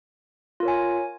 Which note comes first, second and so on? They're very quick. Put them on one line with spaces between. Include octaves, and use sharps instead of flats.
F4 A#4 C#5 G#5